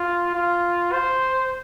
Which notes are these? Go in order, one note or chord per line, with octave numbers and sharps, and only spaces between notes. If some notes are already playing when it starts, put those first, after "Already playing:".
Already playing: F4
F4
C5